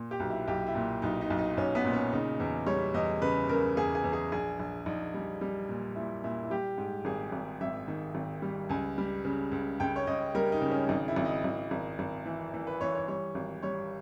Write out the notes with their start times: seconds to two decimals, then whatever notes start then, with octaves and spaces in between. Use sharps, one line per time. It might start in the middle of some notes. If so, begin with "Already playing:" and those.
Already playing: A#2
0.11 G4
0.20 B1
0.30 E4
0.47 B1 G4
0.67 E4
0.75 A#2
1.02 B1 D#4
1.21 D#4
1.30 B1
1.39 D#4
1.57 B1 C#4
1.75 B3
1.84 A#2
1.93 C#4
2.13 C#3 D#4
2.40 E2
2.66 G3 C#5
2.94 E2 D#5
3.21 C#3 B4
3.49 C#3 A#4
3.77 E2 G#4
3.95 G#4
4.04 E2
4.13 G#4
4.32 A#1 G#4
4.59 A#1
4.86 A#1 D#4
5.14 G3
5.41 G3
5.69 A#2
5.96 A#2 E4
6.24 A#2 E4
6.44 E4
6.50 G3 G4
6.78 G#2
7.05 G#1 G#4
7.32 G#1
7.61 G#1 E5
7.88 D#3
8.15 G#1
8.42 G3
8.69 C#2 G#5
8.98 G3
9.25 C#3
9.52 C#2
9.80 C#2 G5
9.96 C#5
10.07 C#2 D#5
10.35 G3 A#4
10.52 D#4
10.61 C#3
10.71 C#4
10.89 G#1 D#4
11.08 E4
11.16 G#1
11.25 D#5
11.44 G#1
11.71 G#1
11.99 G#1
12.26 E3
12.54 E3
12.67 B4
12.81 E3 C#5
12.95 C#5
13.08 G3 C#5
13.35 G#1
13.63 G3 C#5